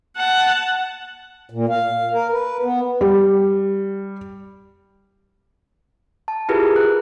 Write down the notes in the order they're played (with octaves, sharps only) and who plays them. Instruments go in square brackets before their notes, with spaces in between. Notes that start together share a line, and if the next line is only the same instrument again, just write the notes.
[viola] F#5 A5
[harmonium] A#2
F5
A#4
B4
B3
[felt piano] G3
[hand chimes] A5
E4 F4 G4 G#4 A#4 B4
F#6